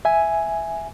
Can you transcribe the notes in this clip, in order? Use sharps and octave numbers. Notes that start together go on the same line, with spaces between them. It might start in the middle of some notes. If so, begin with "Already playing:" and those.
E5 G#5